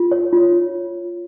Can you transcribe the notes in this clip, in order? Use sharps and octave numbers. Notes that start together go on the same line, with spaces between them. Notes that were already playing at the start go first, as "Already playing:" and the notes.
Already playing: F4
C#5
F4